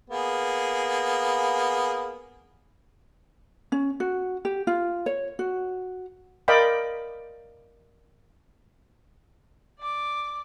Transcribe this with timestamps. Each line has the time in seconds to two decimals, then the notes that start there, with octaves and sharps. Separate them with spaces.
0.10 A#3 B3 G#4
3.72 C#4
4.00 F#4
4.45 G4
4.67 F4
5.06 C#5
5.39 F#4
6.48 A#4 D5 D#5 F5 G5 B5
9.80 D5 D6